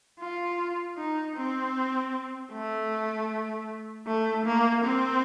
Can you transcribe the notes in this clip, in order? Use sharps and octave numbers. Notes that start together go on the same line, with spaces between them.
F4
D#4
C4
A3
A3
A#3
C4